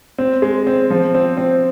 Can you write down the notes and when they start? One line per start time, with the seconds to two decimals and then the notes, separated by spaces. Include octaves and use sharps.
0.18 C4
0.42 G#3
0.67 C4
0.91 F3
1.14 C4
1.37 C4